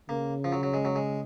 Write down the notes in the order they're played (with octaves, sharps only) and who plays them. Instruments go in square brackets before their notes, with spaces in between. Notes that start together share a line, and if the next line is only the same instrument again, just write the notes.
[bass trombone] C#3 [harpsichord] A#3
[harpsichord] F3
F#3
F#3
G#3
F#3
G#3